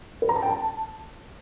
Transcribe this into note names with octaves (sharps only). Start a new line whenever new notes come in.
B4
A#5
A5
G5
A5